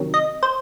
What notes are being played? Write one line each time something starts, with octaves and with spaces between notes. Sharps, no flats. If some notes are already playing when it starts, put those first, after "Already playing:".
Already playing: C3 D#3 F#3
D#5
C5